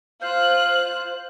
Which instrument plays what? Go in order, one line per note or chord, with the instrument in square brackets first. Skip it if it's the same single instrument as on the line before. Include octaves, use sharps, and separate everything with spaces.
[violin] F4 F#6 [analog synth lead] C5 [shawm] F5